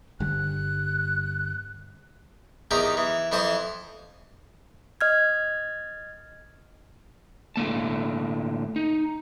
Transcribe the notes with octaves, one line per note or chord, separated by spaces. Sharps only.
G1 D3 G3 F#6
E2 D#3 D#4 G4 A#5
E3
F2 E3 C5 A5 D#6
D#5 F6 G#6
A2 D3 A#3 A5
D#4